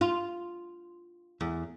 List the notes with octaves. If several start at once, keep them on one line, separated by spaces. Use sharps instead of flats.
F4
E2